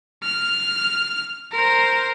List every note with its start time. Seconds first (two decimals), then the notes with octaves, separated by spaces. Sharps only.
0.23 F6
1.52 A#4 C5